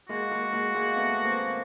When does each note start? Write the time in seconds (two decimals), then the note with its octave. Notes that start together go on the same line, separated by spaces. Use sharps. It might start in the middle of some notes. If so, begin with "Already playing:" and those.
0.09 G#3 A#3 F#4
0.31 G#3 A#3
0.53 G#3 A#3
0.75 G#3 A#3
0.96 A3 B3
1.25 A#3 C4